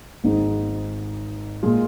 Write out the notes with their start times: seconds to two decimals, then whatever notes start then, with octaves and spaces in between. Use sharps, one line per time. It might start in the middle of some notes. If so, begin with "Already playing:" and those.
0.24 G#1 G#2 G#3 D#4
1.63 A#2 G#3 F4